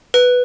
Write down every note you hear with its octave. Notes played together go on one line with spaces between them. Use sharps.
B4